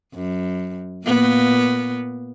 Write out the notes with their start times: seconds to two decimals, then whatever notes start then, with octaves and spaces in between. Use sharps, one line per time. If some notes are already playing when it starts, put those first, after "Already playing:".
0.14 F#2
1.05 A#2 A#3 B3